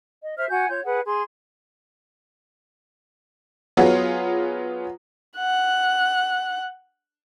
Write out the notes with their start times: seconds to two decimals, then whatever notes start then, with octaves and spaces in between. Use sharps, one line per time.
0.22 D#5
0.37 C5 E5 F6
0.49 F#4 F#5 G#5 G6
0.69 F4 C#5 G6
0.84 G#4 B4 F#5
1.06 G#4 C6
3.77 F#3 B3 F4 G#4
5.37 F#5 F#6